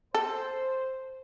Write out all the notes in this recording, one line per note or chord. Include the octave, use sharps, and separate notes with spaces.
A4 C5